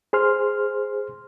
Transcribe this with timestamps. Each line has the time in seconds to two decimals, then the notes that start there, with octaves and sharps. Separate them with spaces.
0.13 G#4 C5 C6 F6